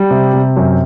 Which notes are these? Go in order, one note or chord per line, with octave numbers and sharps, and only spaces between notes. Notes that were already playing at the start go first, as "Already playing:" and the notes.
Already playing: G3
C3
C3
F#2